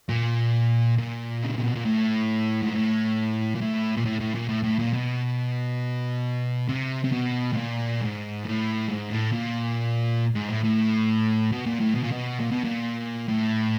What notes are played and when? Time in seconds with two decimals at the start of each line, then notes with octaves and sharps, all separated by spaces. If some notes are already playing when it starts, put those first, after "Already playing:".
0.09 A#2
0.98 A#2
1.43 C#3
1.54 C3
1.64 B2
1.75 A#2
1.85 A2
2.62 G#2
2.73 A2
3.55 A#2
3.61 A2
3.97 A#2
4.06 A2
4.20 A2
4.35 A#2
4.49 A2
4.64 A2
4.79 A#2
4.93 B2
6.69 C3
7.04 C3
7.12 B2
7.53 A2
7.57 A#2
8.01 G#2
8.45 A2
8.88 G#2
9.11 A2
9.32 A#2
10.35 G#2
10.49 A2
10.64 A2
11.52 B2
11.66 A#2
11.81 A2
11.95 B2
12.04 A#2
12.12 B2
12.40 A#2
12.52 B2
12.65 A#2
13.28 A2